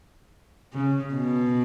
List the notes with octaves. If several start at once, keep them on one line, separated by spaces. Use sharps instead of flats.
C#3
B2